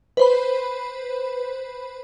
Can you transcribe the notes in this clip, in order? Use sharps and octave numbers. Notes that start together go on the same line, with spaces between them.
B4 C5 B5